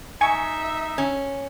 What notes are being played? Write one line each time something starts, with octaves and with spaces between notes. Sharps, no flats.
D#4 E5 G#5 C#6 G#6
C#4